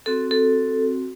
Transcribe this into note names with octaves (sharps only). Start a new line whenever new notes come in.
C4 F#4 A4
A4